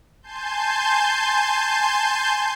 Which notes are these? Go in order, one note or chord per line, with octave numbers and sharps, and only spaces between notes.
G#5 A5 C6 G6